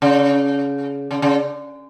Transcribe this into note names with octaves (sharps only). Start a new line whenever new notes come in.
C#3
C#3
C#3